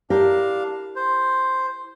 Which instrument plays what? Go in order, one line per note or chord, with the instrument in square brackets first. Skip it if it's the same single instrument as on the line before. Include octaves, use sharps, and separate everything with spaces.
[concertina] D4 F5 [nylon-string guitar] E4 G4 A#4
[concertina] C5